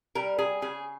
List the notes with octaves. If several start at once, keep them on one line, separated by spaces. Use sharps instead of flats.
G3 A#4
G#4
C#3 G#4